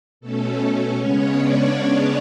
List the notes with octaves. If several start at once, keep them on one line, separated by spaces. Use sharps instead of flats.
B2 A3 C#4 A4
C#3 G#3 B3 C#4 C#5
D4 D5